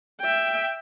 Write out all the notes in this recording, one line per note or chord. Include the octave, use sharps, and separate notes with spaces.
E5 G5